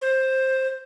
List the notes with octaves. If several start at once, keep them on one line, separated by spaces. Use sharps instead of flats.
C5